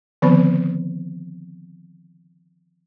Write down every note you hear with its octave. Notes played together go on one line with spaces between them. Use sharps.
D3 D#3 F3 B3 C4 B5